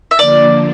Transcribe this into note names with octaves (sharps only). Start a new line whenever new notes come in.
E5
D3 F3 A#3 D4 D5